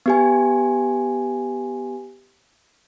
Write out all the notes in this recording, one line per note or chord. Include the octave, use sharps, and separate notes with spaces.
B3 G4 G#5